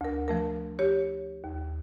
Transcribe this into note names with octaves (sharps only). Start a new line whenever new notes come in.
D2 A#4
F3 A3 A#4
G4 C#5
D#2